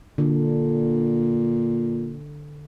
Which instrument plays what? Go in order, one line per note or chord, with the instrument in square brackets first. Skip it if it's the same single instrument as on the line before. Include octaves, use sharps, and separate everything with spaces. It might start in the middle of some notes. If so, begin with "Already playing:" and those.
[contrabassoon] A#2 [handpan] D3